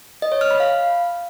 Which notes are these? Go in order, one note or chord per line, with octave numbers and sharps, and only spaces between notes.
D#5
C#5
F6
B5
F5